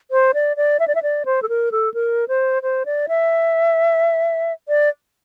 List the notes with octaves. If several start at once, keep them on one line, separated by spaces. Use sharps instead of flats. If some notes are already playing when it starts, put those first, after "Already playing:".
C5
D5
D5
E5
D5
E5
D5
C5
A4
A#4
A4
A#4
C5
C5
D5
E5
D5